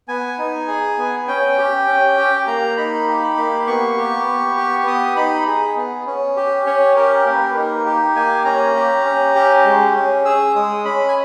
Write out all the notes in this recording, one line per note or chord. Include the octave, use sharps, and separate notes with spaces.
B3 G#5
D#4
G#4
B3
C#4 G5
G4
C#4
G4
A#3 A#5
D#4 B5
G4
A#3
B3 C#6
G4
B3
G4
B3 D#6
D#4 B5
G#4
B3
C#4
G4
C#4 C#5
G4 A#4
A#3 A#4
B4
A#4
B4
D#4 A#4
G4
A#3 G#5
C#4 A#5
G4
C#4
G4
G#3
C#4
G#4 E6
G#3 D#6
C#4 B5
G#5